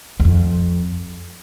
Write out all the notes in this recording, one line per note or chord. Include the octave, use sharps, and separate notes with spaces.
E2
F2